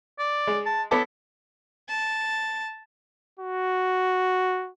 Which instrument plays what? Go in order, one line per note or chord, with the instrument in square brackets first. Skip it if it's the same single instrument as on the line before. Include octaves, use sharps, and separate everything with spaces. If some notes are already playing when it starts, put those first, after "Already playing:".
[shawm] D5
[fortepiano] G#3
[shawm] A5
[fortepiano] B3 A4 D6 [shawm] E4
[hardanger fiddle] A5
[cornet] F#4